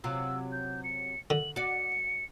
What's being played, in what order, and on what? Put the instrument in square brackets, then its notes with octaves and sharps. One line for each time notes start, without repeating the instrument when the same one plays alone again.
[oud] C3 F#3 F4 [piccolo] E6
[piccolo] G6
C#7
[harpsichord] D3 [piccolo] F#7
[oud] F#4 D5 [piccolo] C#7